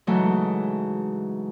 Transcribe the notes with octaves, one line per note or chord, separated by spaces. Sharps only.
G#2 C#3 E3 F#3 G#3 A3